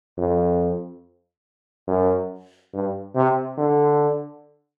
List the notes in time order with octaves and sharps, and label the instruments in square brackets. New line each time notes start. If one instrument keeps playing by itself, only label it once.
[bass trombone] F2
F#2
G2
C3
D3